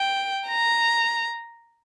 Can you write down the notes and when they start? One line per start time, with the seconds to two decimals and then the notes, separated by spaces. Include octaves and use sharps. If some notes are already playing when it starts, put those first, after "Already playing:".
Already playing: G5
0.47 A#5